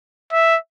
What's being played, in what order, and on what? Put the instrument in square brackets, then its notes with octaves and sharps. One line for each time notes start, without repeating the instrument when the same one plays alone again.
[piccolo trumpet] E5